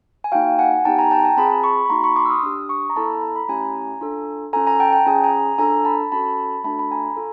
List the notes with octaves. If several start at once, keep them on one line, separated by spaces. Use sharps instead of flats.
G#5
A#3 D#4 F#4 F5 G5
F#5 G#5
B3 D#4 G4 G5 A5
G#5 A#5
G5 A5
G#5 A#5
C4 F4 G#4 A5 B5
B5 C#6
B5
A#3 D#4 F#4 A#5 C6
B5 C#6
C6 D6
E6
D#6 F6
D4 G4
C#6 D#6
A#5
B3 E4 A4 A5 B5
A#5
B5
A3 C#4 E4 G4 G#5 A#5
D4 F4 A4
C#4 F4 A4 G#5 A#5
G#5 A#5
G5 A5
G5 A5
C#4 F4 G#4 G#5 A#5
G#5 A#5
D4 F4 A4 G#5 A#5
A5 B5
C#4 F#4 A4 A5 B5
A3 D4 F#4 A4 A5 B5
B5
G#5 A#5
F4 A4